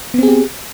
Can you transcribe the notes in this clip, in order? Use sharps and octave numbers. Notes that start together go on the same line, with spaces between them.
B3 C4 G4 G#4